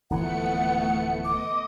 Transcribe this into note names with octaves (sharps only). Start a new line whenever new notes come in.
D1 E3 F3 A3 B3 F#5 C#7
D#5 D6 D#6